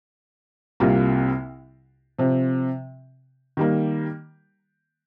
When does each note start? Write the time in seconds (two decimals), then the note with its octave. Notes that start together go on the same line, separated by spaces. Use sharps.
0.80 C2 C3 G3 A#3 F4
2.19 C3 F3 C4
3.57 D#3 G3 A#3